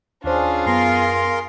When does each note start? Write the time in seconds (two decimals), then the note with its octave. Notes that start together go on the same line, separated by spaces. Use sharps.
0.24 D#2 C#4 D4 F4 G#4 C5
0.66 F#2 B3 A#4 F5 C6